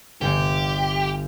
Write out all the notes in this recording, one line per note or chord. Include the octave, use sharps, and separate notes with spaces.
G1 G4